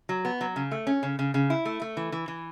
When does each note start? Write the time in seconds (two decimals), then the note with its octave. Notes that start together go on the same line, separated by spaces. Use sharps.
0.09 F#3
0.25 B3
0.41 F#3
0.56 C#3
0.72 A3
0.87 C#4
1.03 C#3
1.19 C#3
1.34 C#3
1.50 E4
1.65 A3
1.82 A3
1.97 E3
2.12 E3
2.28 E3